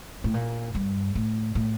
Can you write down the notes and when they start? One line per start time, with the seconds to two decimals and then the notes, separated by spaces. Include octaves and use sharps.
0.24 A2
0.34 A#2
0.75 G2
1.15 A2
1.55 A2